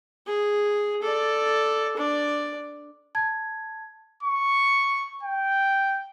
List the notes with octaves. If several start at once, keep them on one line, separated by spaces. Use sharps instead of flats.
G#4
A4 D5
D4 D5
A5 G#6
C#6
G5